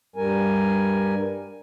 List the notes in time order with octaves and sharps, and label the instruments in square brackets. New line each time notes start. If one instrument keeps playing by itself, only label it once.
[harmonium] G2 G3 A#4 G#5